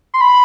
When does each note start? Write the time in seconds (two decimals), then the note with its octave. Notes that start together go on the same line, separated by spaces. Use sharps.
0.14 C6
0.21 B5